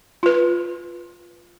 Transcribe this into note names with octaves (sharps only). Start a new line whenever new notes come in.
F4 B4